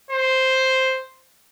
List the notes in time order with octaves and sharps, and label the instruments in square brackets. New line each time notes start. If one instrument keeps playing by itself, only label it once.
[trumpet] C5